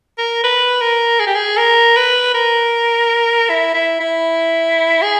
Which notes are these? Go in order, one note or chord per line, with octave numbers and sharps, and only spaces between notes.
A#4
B4
A#4
G#4
G4
G#4
A#4
B4
A#4
E4
E4
E4
G#4